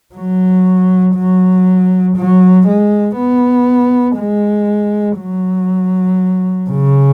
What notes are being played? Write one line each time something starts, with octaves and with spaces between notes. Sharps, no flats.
F#3
F#3
F#3
G#3
B3
G#3
F#3
C#3